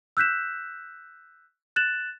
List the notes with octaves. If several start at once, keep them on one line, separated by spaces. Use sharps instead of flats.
E6 F#6 G6 B6 E7
F#6 A6 E7 F#7